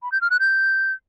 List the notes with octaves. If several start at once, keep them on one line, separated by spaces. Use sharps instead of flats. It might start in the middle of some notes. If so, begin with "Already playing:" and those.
B5
G6
F6
F#6
G6